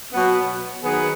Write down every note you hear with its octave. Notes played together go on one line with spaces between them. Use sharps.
B2 F#3 B3
D#3 F#3 B3 G#4 B4